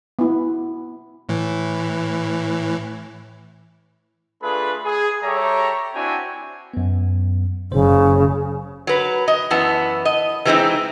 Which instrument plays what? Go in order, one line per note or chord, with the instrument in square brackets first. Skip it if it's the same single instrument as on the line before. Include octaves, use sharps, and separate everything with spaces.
[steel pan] B3 E4
[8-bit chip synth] A2 E3
[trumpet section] A3 D4 F4 G#4 B4 B5
G#4
G3 G4 A4 C#5 E5 A#5
C4 D4 E4 F#4 G5 G#5
[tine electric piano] F#2 B3
[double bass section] F#1 [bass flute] C#3 [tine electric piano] C5
[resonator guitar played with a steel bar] F#3 B4
D#5
F#2 E3 B3 A5
D#5
E3 G3 G#3 A#3 C4 D#4